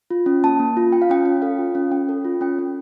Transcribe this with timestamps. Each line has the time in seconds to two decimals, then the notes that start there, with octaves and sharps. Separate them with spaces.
0.11 F4
0.26 C#4
0.44 A#3 A5
0.59 A#3
0.77 F4
0.92 F4 G5
1.02 F5
1.10 C#4 G5
1.25 C#4
1.42 A4 F5
1.59 F4
1.75 C#4
1.91 C#4 G5
2.09 A4
2.24 F4
2.41 C#4 G5
2.59 C#4